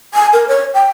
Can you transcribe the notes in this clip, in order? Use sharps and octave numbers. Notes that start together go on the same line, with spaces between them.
G#5
A#4
C#5
G5